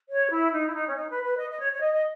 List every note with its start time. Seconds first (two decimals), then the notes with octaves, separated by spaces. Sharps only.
0.09 C#5
0.30 E4
0.52 D#4
0.68 E4
0.73 D#4
0.88 C#4
0.95 D#4
1.09 B4
1.24 B4
1.38 D#5
1.50 D#5
1.59 C#5
1.73 C#5
1.81 D#5
1.92 D#5